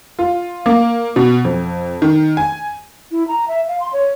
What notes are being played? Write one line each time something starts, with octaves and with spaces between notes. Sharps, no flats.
F4
A#3
B2
F2
D#3
G#5
E4
A#5
E5
F5
C6
C#5